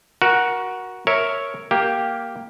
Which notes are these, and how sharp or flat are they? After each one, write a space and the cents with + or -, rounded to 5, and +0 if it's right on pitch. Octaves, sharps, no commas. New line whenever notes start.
F#4 +0 A#4 +25
A#4 +0 C#5 +0 E5 -5
A#3 +0 G4 +0